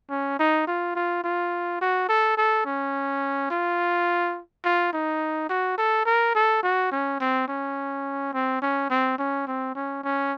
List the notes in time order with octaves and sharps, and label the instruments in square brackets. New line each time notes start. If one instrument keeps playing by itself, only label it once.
[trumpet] C#4
D#4
F4
F4
F4
F#4
A4
A4
C#4
F4
F4
D#4
F#4
A4
A#4
A4
F#4
C#4
C4
C#4
C4
C#4
C4
C#4
C4
C#4
C#4